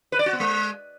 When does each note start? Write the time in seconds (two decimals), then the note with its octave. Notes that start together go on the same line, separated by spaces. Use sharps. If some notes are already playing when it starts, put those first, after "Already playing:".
0.12 B4
0.19 D5
0.26 F#4
0.33 B3
0.40 G#3